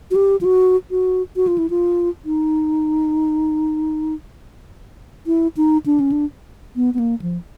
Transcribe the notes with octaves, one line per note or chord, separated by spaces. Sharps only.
F#4
G4
F4
F#4
F#4
F#4
F4
E4
F4
D#4
E4
D#4
D4
C#4
D4
B3
B3
A#3
F3